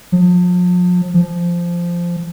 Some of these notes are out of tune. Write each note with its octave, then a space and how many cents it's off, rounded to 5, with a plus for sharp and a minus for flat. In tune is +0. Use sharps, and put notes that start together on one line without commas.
F3 +40
F3 -10